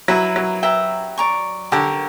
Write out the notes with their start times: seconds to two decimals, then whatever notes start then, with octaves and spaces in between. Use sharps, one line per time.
0.08 F#3 E4 B4 E5 A#5
0.36 F#3
0.63 B4 E5 G5 A#5
1.18 D5 A#5 C#6
1.72 D3 G4 A#4 C#5